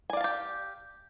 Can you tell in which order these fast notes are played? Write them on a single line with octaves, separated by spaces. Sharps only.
G#5 D5 F5 A5 G4